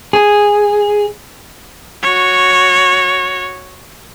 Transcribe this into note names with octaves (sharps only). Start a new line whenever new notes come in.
G#4
F#4 C#5